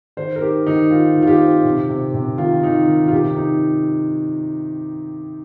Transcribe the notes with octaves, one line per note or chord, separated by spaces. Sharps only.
D#3 C5
A#4
D#4 G4
D#3 D#4
D#3 F4
D#3
F4
G4
C4
C3
C3
C3
D#3 F4
D#3 D#4
D#3
F4
C3 G4
D#4